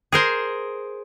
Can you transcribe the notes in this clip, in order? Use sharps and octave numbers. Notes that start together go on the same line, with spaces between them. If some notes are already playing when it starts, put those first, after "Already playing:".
G#4 A#4 C5